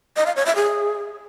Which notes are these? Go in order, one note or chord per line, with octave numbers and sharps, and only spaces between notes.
D#5
F5
C#5
E5
G#4